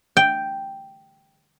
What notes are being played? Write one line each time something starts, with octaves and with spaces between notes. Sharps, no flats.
G5